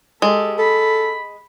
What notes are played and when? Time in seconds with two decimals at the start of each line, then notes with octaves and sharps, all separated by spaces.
0.22 G#3 G4 A4
0.59 A4 B5